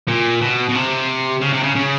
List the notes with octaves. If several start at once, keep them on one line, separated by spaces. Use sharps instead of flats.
A#2
B2
B2
C3
C#3
C3
C#3
C#3